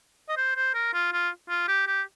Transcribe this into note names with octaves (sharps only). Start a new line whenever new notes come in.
D#5
C5
C5
A#4
F4
F4
F4
G4
G4